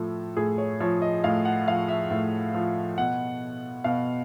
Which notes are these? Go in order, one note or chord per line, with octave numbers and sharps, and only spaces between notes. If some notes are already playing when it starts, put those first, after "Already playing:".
Already playing: A2 F3 A4
A2 G#4
C#5
F3 C#5
D#5
A2 F5
F#5
F3 F5
E5
A2
F3
B2 F#5
B2 F5